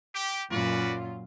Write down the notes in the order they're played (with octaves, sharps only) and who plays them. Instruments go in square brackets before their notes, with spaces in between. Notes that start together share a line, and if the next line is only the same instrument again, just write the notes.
[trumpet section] G4
[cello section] F#2 A#2 F4 [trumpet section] F#4 B4 D5